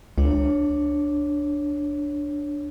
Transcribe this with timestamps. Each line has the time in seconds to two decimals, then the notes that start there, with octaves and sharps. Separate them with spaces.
0.18 C#2 D4 C#5